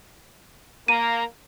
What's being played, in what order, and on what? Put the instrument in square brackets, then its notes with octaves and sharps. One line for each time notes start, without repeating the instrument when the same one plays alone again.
[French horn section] A#3 [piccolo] A#5 [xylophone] D#7